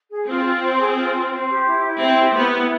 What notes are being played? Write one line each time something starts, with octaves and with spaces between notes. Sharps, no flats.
G#4
C4 F4
F4
C5
G#4
F4
F4
C5
G4
E4
E4
C4 C5
G4
B3 E4
E4